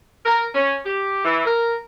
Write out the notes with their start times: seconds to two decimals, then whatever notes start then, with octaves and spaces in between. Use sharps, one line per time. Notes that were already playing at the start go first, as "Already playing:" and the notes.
0.24 A#4
0.54 C#4
0.84 G4
1.25 E3
1.45 A#4